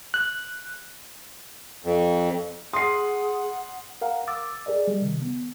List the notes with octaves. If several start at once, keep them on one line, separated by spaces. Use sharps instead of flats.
F#6
F2
G#4 F#5 C6 D#6 C7
A#4 F5 F#5 A#5
D6 E6 A6
G#4 A#4 D5 D#5
G3
C3 D#3
B3